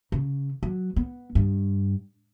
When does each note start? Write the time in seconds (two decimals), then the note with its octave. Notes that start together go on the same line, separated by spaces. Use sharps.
0.12 C#3
0.63 F#3
0.96 B3
1.35 G2